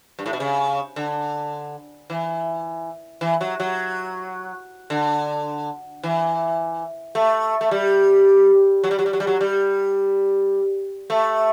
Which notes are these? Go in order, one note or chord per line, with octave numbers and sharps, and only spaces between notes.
G2
A2
B2
C#3
D3
E3
E3
F#3
F#3
D3
E3
A3
A3
G3
F#3
G3
F#3
G3
F#3
G3
F#3
G3
A3